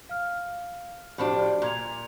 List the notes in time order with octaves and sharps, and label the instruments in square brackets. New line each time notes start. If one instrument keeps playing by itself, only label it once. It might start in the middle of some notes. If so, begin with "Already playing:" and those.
[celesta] F5 F6
[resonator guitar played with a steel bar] A2 F3 D4 [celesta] F#4 G4 C5
[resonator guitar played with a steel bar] A#2 [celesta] A#5 G#6 F7